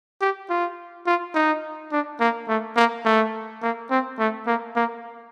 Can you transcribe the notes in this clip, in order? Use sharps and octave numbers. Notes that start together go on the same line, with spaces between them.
G4
F4
F4
D#4
D4
A#3
A3
A#3
A3
A#3
C4
A3
A#3
A#3